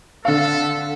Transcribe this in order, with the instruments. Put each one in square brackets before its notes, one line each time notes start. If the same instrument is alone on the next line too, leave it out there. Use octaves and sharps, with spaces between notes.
[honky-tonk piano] D3 F5 [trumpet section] A4